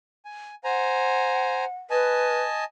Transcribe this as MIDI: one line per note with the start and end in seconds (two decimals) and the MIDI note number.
0.25 0.55 80
0.64 1.65 72
0.64 1.76 78
0.64 1.65 80
0.64 1.65 82
1.90 2.42 71
1.90 2.64 75
1.90 2.64 80
1.90 2.64 81